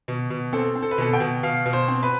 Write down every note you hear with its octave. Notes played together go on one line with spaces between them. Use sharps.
B2
B2
C4 A4
C4
A4
B4
B2 A4
G5
B2
B2 F5
B2
C5
C4
B4